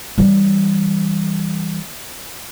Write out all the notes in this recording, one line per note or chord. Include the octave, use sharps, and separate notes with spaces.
E3 G3